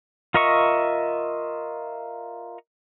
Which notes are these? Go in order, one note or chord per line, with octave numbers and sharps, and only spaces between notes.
F4 A#4 D#5 E5 C#6